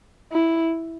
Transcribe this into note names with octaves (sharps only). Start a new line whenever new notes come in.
E4